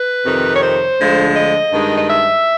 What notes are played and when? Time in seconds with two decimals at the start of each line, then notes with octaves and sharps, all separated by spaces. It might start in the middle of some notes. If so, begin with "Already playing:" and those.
Already playing: B4
0.24 F2 C3 D#3
0.55 C#5
0.61 C5
0.98 D2 D3 F3 G#3
1.34 D#5
1.71 G2 D#3 G#3
1.97 D#5
2.08 E5